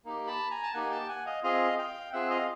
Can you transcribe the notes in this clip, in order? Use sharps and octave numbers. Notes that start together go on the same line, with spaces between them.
A#3 D#4 G4
A5 B5
G#5 A#5
A5
A#3 D#4 G4 F#5 G#5
G5 A5
F#5 G#5
D#5 F5
C4 F4 G#4 D#5 F5
F5 G5
C4 F4 G#4 E5 F#5
D#5 F5